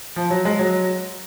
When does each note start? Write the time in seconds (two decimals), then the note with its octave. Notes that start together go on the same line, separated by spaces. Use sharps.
0.16 F3
0.30 F#3
0.45 G#3
0.59 F#3